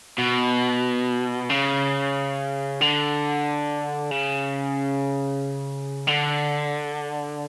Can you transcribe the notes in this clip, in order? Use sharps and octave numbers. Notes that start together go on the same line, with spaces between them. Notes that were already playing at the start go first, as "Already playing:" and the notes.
B2
C#3
D3
C#3
D3